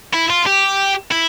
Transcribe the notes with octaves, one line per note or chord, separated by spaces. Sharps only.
E4
F4
G4
E4